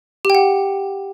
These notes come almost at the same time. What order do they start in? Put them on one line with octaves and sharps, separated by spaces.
G4 G5 F#5